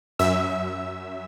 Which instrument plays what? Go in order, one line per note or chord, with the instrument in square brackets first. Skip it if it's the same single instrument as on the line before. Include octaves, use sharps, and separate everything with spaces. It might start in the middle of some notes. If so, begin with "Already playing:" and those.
[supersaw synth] F#2 E5 E6